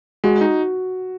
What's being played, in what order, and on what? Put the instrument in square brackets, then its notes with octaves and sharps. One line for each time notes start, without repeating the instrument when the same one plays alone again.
[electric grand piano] G#3 [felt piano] F#4
[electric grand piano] D#4